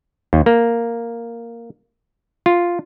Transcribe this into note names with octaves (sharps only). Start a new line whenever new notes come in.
D#2
A#3
F4